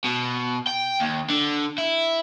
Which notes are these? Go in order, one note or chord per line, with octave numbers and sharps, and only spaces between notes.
B2
G5
D#2
D3
E4